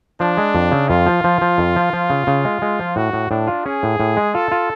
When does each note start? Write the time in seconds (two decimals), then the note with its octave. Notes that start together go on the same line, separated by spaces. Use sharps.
0.20 F3 D4
0.37 G#3
0.55 F2
0.71 C#3
0.89 F2 F4
1.06 F3
1.24 F3
1.41 F3
1.58 F2
1.76 F3
1.93 F3
2.10 C#3
2.27 C#3
2.45 G#3
2.62 G#3
2.79 F3
2.96 A2 F#4
3.13 A2
3.31 A2 D4
3.47 F4
3.65 C#4 G#4
3.83 A2
4.00 A2
4.17 G#3
4.34 F4 A4
4.51 F4